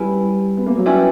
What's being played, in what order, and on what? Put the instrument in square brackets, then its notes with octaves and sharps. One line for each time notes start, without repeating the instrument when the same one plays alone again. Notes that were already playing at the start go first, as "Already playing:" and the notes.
Already playing: [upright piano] G3 [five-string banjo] C#4 E4 B4
[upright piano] B3
A#3
F#3
[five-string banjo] G3 C#4 E4 B4